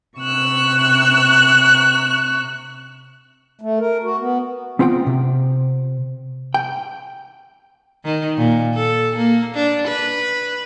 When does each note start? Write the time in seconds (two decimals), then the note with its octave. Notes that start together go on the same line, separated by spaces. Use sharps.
0.17 C3 C#6 E6 F#6
3.61 A3
3.79 A#4
4.03 F#4
4.19 B3
4.79 B3 C4 F4 F#5 G5
5.06 C3
6.54 G5
8.05 D#3
8.38 A#2
8.75 A4
9.16 A#3
9.55 D4
9.87 B4